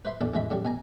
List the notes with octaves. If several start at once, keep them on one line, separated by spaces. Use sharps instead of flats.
B4 C5 E5 B5 C6
A#1 E2 E3 D4 A4
A1 F2 E3 G#3 E5 B5
A2 C#3 F#3 G3
B2 G#5 A#5